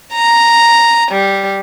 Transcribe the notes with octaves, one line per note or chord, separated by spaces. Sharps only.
A#5
G3